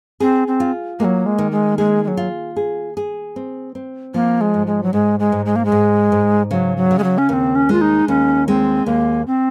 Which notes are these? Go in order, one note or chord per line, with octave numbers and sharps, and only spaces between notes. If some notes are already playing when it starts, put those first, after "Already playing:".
C4 G#4
C4
F4
F#3 G#3 A#3
G#3
D#3
G#3
G#3 G#4
G#3
F#3
F4
G#4
G#4
C4
C4
F3 A#3
G#3
G#2
G#3
F#3
G#2 G#3
G#3
G#2
G#3
A#3
G#3
G#2
G#2
C#3 F#3
F#3
C#3
G#3
F#3
C#4
D#2 C4 C#4
C#4
G#3 F4
D#4
D#2 C#4
G#3 C4
D#2 A#3
C4